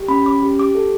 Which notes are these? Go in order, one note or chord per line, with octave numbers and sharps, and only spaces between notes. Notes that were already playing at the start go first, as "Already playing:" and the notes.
Already playing: G4
C#4 B5
C#4 D6
G4
G4 D6
A4